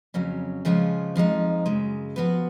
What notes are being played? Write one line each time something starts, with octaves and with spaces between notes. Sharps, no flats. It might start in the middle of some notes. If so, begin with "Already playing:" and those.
F2 C#3 F#3 C#4
C#3 F3 G#3 C#4 F4
F2 F3 G#3 D#4
F#2 C#3 G#3
F3 B3 F#4 B4